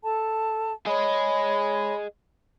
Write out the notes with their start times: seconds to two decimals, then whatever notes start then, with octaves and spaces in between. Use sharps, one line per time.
0.02 A4 A5
0.87 G#4 C#5 D#5 B5